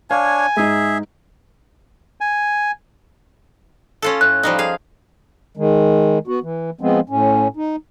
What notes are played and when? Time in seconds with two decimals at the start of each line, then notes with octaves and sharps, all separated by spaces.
0.11 D4 C#5 F5 G#5
0.57 G#2 D#4 G#4 E5
2.21 G#5
4.02 C#4 F4 A4
4.21 A2 F#6
4.43 F3 G3 D#4
4.59 G#4 F5
5.57 D#3 G#3
6.27 B3 F#4
6.43 E3
6.81 F3 G#3 B3 C4
7.09 A2 C#4
7.56 D#4